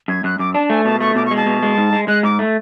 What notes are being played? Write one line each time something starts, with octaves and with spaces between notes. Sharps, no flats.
F#2 G#6
F#2 F#6
F#2 D6
D4 A5
A3 G#5
B2 A5
A3 C#6
B2 D6
C#6
G#3
A5
B2
G#3
G#2
G#3
G#3 F#6
G#2 D6
A3